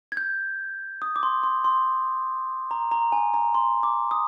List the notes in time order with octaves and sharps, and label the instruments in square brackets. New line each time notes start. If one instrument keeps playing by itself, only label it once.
[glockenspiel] G#6
G6
D#6
D6
C6
C6
C6
A#5
A#5
G#5
A#5
C6
D6
D#6